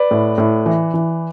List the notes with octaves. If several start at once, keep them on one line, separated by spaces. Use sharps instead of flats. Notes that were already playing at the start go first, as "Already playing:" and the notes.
Already playing: B4 D5
A2
A2
E3
E3